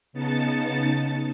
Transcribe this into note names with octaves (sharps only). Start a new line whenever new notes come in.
C#3 B3 D#4 A5 A6 C#7